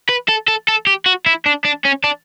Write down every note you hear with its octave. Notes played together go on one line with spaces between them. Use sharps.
B4
A4
A4
A4
G4
F#4
E4
D4
D4
C#4
D4